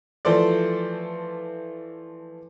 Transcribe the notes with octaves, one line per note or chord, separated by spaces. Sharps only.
E3 F3 A3 A4 C5 D5